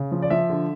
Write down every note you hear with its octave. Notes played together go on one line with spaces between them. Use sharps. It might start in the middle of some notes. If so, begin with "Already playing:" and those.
Already playing: C#3
F3
D5
F3 E5
D3